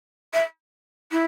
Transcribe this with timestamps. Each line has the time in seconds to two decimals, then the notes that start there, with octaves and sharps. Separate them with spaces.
0.33 E5
1.12 E4